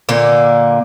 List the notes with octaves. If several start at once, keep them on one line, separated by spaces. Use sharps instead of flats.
A#2 D3 A#3